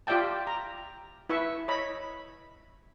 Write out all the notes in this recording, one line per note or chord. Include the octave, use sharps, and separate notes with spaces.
F4 G4 D5 E5 G5 A5
A#5
E4 B4 E5 C#6
C#5 D#5 B5